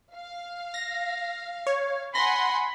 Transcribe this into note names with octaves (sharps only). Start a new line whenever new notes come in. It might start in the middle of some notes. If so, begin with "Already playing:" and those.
F5
A#6
C#5
F#5 G#5 B5 C6 A#6